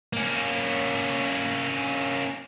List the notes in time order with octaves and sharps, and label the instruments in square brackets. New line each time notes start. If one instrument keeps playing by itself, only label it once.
[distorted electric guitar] A#3 C#4